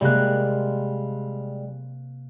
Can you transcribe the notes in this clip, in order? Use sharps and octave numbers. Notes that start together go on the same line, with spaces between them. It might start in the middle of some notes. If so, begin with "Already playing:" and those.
C3 G3 G#3 A#3 F#6